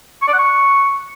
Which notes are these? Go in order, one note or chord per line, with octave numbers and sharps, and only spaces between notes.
C#6
D5
F#5
C#6